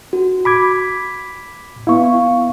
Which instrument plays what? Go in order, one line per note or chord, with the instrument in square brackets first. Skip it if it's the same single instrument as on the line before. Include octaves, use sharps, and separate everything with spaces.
[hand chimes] F#4
[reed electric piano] B5 D6 G#6 [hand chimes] B6
[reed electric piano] B3 E4 [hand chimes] F5 C#6